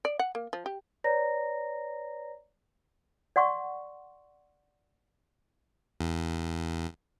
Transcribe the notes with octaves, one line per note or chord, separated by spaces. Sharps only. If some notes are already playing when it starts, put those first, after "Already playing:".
D5
F#5
A#3
F3
G4
B4 C#5 D5 A#5 A#6
D5 F#5 C6 C#6
E2